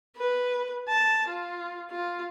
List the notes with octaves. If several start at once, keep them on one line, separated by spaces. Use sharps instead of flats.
B4
A5
F4
F4